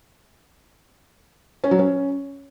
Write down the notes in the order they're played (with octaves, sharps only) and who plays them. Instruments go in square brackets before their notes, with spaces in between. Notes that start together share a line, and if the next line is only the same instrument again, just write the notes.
[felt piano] C#4
F#3
C#4